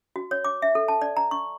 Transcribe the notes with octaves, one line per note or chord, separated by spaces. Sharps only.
F#4
C#5
D6
E5
A4
A5
D5
A#5
C#6